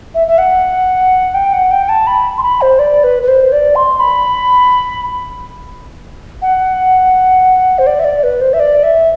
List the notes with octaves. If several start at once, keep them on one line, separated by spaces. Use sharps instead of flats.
E5
E5
F#5
G5
F#5
G5
A5
B5
C6
B5
C5
D5
B4
B4
C5
D5
C6
B5
F#5
C5
D5
E5
D5
B4
C5
E5
D5
E5